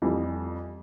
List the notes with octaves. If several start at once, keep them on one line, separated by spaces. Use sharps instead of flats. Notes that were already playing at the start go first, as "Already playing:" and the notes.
F2 E3 G3